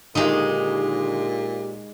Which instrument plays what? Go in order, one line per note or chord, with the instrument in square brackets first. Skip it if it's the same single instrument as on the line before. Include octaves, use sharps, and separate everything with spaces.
[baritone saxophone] A#2 [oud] D3 D#3 F4 [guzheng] G#3 D#4 [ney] G4